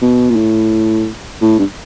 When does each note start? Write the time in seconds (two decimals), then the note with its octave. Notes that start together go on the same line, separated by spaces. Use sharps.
0.02 B2
0.29 A#2
0.36 A2
1.42 A2
1.59 G2